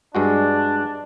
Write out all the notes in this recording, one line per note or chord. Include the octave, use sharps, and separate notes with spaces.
G2 G#3 D4 F#4